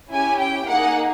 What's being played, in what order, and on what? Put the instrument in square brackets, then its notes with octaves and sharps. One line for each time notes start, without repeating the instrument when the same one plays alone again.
[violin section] C#4 E4 G4 G#5
G5
A#3 D#4 G#4 F#5